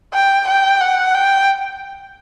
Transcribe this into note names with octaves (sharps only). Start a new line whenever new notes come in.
G5
G5
F#5
G5